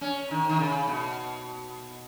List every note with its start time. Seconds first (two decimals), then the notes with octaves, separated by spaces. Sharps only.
0.01 C#4
0.30 D#3
0.49 D#3
0.59 C#3
0.88 B2